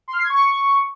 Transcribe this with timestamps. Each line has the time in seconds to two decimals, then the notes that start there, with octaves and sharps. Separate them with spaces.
0.08 C6
0.13 F6
0.19 C7
0.24 G#6
0.30 C#6